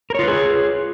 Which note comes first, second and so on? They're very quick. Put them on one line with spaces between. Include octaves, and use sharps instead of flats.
A#4 C#5 F4 B4 G#4